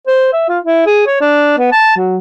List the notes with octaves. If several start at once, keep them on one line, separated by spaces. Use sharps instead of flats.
C5
E5
F4
E4
G#4
C#5
D4
B3
A5
F#3